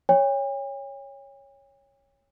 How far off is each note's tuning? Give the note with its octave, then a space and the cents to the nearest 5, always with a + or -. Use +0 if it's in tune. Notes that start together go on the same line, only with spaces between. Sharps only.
C#5 +0 G5 +45